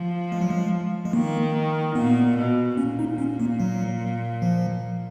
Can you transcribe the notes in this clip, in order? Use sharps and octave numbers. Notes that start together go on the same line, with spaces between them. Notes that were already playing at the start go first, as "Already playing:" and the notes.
Already playing: F3
G#3
F#3
G#3
G#3
D#3 A#3
A#2 B3
B2
A#2 C#4
D#4
C#4
A#3
F#3
F3